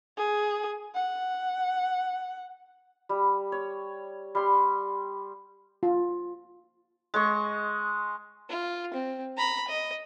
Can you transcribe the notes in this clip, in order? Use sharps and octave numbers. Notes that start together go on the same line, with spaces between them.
G#4
F#5
G3
C#5
G3 C6
F4
G#3 D#5 C#6
F4
C4
A#5 B5
D#5